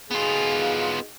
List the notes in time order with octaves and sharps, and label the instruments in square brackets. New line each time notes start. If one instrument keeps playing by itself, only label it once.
[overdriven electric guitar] B3 F4 [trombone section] D#4 F#4 G#4